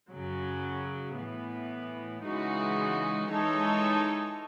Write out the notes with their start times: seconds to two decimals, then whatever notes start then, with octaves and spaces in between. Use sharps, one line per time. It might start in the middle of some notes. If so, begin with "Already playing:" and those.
0.11 F#2 C#3 F#3
1.17 A2 E3 B3
2.24 C#3 E3 G#3 D#4 F#4
3.30 E3 G#3 D#4 A4 C#5